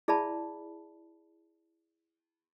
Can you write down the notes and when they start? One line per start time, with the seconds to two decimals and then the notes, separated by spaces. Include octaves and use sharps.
0.08 E4 G#4 D5 E5 A5 B5